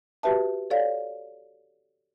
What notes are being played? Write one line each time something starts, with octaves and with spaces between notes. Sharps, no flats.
F#4 G4 B4 E5 A5
A4 C#5 D5 F5